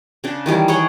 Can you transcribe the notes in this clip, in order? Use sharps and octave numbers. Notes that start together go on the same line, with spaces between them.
C#3 D4
D#3 E3 G3 G#3
G#4 C#5 F#5 G5